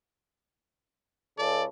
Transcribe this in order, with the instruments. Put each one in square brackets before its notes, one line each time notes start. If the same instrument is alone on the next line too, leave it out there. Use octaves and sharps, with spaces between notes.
[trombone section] C#2 C#3 A4 [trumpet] D5